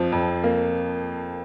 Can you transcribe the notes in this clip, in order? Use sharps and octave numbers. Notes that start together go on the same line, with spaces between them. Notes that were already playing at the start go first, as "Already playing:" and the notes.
Already playing: F2 F3
F2
A#3